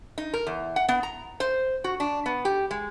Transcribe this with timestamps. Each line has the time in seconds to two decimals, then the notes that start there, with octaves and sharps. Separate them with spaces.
0.18 D#4
0.33 A#4
0.47 E2
0.76 F#5
0.89 B3
1.03 A#5
1.40 C5
1.84 F#4
2.00 D4
2.26 B3
2.45 G4
2.71 G#3